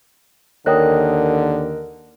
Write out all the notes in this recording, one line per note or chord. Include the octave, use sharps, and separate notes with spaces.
D#2 D3 A#4 C#5 D#5 G5 D#6 F#6